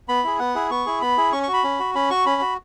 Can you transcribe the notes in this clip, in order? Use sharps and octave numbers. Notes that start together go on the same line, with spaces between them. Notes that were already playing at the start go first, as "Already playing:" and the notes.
B3 B5
E4 G#4
B3 F#5
E4 G#4
B3 C#6
E4 G#4
B3 B5
E4 G#4
C#4 C#6
C#6
F#4
B5
C#4
F#4
C#4 B5
F#4 C#6
C#4 B5
F#4